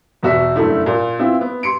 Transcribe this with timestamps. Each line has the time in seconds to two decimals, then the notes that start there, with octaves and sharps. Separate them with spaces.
0.23 E2 B2 F#4 E5
0.56 F#1 G2 A3 E4
0.86 A#2
1.19 B3 C4 E4 F4
1.41 B3
1.63 C6 C#7 D7